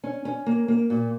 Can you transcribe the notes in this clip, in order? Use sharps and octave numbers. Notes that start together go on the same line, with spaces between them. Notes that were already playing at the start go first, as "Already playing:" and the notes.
C#4
C#4
A#3
A#3
A#2